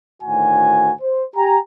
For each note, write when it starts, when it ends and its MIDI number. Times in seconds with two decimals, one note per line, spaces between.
0.23 0.93 38
0.23 0.93 45
0.23 0.93 51
0.23 0.93 66
0.23 0.93 80
1.01 1.24 72
1.36 1.59 67
1.36 1.59 79
1.36 1.59 80
1.36 1.59 82